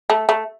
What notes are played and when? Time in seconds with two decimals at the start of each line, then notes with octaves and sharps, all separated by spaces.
0.10 A3
0.29 A3